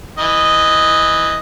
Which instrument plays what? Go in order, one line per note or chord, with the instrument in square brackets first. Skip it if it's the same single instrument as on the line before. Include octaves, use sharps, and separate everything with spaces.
[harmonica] E3 D#5